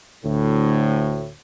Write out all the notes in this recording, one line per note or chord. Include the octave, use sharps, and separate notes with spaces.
D2 A2